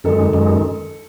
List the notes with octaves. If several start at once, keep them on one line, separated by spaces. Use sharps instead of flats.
F#2 D#3 G#3 A4
F#2 D#3 G#3